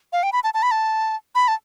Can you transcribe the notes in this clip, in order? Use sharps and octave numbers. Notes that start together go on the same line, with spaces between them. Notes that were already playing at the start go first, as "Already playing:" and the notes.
F5
G5
B5
A5
A5
B5
A5
B5
A5